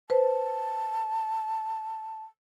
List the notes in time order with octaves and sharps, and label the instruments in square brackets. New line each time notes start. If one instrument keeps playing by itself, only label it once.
[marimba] B4 C5 [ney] A5